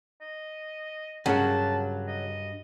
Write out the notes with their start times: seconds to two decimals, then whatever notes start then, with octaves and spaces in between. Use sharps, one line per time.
0.21 D#5
1.26 G2 C#3 F#3 A#4 F#5 A5
2.08 D#5